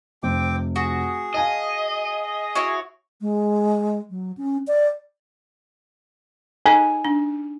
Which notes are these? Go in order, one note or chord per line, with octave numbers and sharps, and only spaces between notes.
F1 C4 G5 D6
F#4 G#4
D#5 F5 G#5 A5
E4 F#4 C#5
G#3
F#3
C#4
D5
D#4 A4 D#5 G#5
D4